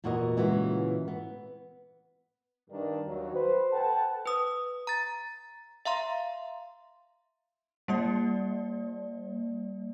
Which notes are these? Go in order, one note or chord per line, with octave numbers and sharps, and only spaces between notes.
E2 A#2 E4 F#4 A#4 D#5
A#2 C#3 E3 G#3 B3 F#4
B3
G2 D#3 D4
D#2 F#3
B4 C5
A4 B4 F#5 G5 A5
B4 D#6
A#5 A6
E5 F5 A#5 C6
G3 A#3 D5